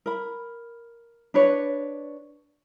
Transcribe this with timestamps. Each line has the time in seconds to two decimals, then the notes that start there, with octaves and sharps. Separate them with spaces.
0.06 A#4 B5
1.34 D4 B4 C#5